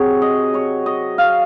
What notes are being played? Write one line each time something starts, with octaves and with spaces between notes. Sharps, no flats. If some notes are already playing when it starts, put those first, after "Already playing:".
Already playing: C3 F#3 G#4 C#5
D#5
C#5
D#5
F5